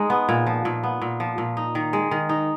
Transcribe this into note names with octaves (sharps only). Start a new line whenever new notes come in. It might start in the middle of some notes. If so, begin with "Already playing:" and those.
Already playing: G#3 D#4
B3
A#2
F3
A#2
B3
A#2
F3
A#2
D#4
D#3
G#3
D#3
D#4